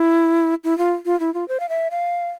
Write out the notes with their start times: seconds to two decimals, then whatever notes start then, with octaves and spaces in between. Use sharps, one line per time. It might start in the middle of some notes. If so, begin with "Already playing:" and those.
Already playing: E4
0.64 E4
0.78 F4
1.06 F4
1.20 E4
1.34 F4
1.48 C5
1.60 F5
1.69 E5
1.91 F5